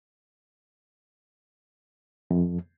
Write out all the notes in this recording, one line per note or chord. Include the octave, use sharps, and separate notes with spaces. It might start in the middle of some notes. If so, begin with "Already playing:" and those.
F2